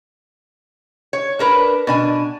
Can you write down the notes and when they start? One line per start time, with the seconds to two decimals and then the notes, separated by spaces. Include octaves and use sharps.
1.13 C#5
1.39 D4 A#4 B4
1.87 B2 D4 G#5